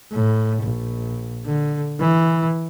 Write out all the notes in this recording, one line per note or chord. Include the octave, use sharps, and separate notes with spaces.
A2
A#1
D3
E3